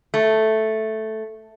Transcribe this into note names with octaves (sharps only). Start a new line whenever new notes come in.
A3